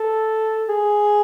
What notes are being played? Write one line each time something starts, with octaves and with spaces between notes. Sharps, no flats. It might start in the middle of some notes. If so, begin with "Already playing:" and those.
Already playing: A4
G#4